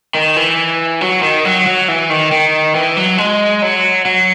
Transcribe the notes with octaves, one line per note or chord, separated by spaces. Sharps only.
D#3
E3
F#3
D#3
F#3
F#3
E3
D#3
D#3
E3
F#3
G#3
F#3
F#3